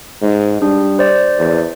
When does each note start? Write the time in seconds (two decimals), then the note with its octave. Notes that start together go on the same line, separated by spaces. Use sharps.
0.22 G#2
0.62 G3 D4
0.99 C5 D5
1.38 E2